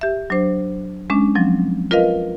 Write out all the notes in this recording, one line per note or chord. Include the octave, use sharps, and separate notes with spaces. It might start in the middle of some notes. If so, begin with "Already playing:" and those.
G4 E5
F#3 D4 C5
G#3 C#4 D4
F3 F#3 C4
F4 A#4 B4 D#5 F5